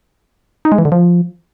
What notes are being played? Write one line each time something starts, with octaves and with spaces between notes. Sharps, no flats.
D#4
G#3
E3
D3
F3